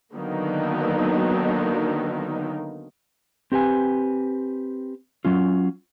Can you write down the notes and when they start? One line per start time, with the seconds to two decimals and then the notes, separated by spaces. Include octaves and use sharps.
0.15 D3 D#3 F#3 A#3 B3 D#4
3.52 C4 G4 B4 G#5
5.25 F#3 C#4 F4